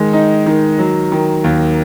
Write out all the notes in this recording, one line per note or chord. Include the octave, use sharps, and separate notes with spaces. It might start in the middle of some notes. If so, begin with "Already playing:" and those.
Already playing: D#3 G#3
D#4
D#3
F#3
D#3
D#2